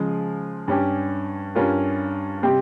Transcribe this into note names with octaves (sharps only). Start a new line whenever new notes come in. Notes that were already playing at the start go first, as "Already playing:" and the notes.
Already playing: C#3 F3 G#3
G2 G3 C#4 G4
G2 G3 C#4 F4 A#4
C3 G3 C4 G4